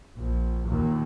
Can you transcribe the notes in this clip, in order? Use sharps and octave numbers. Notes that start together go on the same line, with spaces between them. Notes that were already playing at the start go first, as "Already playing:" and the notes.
A#1
D#2 A#2